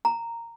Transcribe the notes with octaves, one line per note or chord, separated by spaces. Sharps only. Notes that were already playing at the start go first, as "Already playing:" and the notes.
A#5